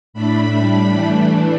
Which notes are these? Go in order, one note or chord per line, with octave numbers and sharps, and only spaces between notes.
A2 A3 D4 B5
A2 G3 D4
E3 A3 D4